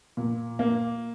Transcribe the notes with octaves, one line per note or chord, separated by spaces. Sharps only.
A#2
A#3